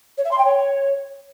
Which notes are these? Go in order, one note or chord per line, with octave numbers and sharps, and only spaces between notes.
C#5
E5
C6
G5
C#5